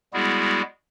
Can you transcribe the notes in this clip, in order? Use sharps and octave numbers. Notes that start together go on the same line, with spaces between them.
G3 G#3 B3 E4 F#4 G#4